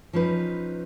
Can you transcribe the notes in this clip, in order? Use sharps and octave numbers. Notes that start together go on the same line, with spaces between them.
F3 C#4 D#4 B4